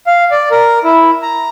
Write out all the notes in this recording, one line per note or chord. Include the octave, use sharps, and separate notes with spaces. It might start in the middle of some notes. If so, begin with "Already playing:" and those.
F5
D5
A#4
E4
A#5